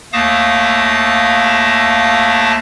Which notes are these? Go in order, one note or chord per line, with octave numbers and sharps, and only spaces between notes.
D#2 A3 F5 A5 D#6 A#6